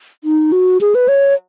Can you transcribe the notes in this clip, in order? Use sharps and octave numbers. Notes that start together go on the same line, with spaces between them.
D#4
F#4
G#4
B4
C#5